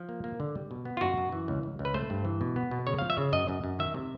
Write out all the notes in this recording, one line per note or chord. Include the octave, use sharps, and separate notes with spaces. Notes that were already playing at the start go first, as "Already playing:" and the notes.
Already playing: F3
A#3
A#3
D3
G3
B2
B3
F4
F#2 F#4
F#2
E3
C#2
C#2
C#2
B4
A3 C5
G2
E3
B2
B3
B2
C#3 C#5
F3 F5
E5
C#3
F#2 D#5
F#2
F#2
D#3 E5
C3